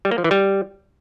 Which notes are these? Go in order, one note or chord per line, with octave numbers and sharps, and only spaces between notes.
G3
A#3
F3
E3
G3